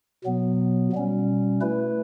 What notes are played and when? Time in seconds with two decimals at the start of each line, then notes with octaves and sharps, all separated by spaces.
0.24 B2 F#3 B3
0.93 B2 G3 C#4
1.61 A3 E4 B4